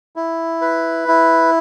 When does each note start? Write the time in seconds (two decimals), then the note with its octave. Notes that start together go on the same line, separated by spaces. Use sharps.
0.16 E4
0.61 B4
1.08 E4